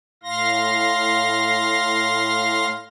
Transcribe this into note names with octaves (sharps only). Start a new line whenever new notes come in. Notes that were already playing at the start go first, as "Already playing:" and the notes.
A2 F5 C6 A#6